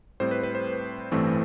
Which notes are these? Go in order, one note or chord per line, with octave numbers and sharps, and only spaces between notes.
A2 G3 C4 C5
B4
B4
C5
A1 G2 E3 A3 C4